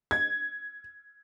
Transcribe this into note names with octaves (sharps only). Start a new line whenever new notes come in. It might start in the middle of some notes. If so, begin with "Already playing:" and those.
G#6